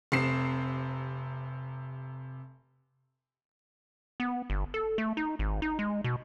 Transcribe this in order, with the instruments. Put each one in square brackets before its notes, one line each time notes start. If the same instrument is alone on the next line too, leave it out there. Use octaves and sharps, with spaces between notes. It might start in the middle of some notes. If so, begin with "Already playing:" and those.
[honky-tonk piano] F1 C3 C7 E7
[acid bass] B3
G1
A4
A3
D#4
G#1
D#4
G#3
B2